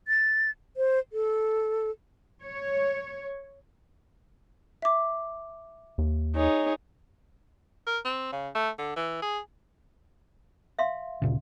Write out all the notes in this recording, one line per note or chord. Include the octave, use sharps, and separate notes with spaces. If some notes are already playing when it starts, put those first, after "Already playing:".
A6
C5
A4
C#5
E5 D6
D#2
D#4 G#4 C#5
A#4
C4
C#3
A3
D3
E3
G#4
E5 F5 C6
D1 A#2 C#3